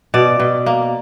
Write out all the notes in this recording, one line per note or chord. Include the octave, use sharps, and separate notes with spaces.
B2 D5
B2
A#3